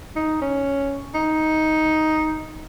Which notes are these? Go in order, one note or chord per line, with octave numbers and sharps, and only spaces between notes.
D#4
C#4
D#4